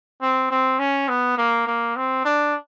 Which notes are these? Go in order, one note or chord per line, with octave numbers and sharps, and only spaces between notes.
C4
C4
C#4
B3
A#3
A#3
C4
D4